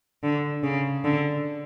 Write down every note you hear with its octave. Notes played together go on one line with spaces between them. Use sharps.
D3
C#3
D3